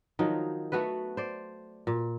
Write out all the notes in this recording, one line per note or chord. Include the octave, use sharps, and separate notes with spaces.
D#3 F3 F#3 D#4
A3 B3 F#4 B4
C5 D5
A#2